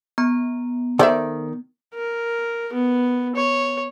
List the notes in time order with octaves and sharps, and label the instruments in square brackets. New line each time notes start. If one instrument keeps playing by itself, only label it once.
[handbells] B3 A#5
[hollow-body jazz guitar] D#3 D5 [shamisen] A4 C5 E5
[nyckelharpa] A#4
B3
C#5